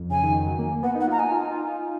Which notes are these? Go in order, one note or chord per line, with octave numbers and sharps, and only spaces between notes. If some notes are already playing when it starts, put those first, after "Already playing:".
Already playing: F2
C#3 G#5
D#3
D#3
F#3
A#3
A#3
B3 F#5
D#4
F#5
F4
A#5
D#4 G#5
F4
D#4
F4
D#4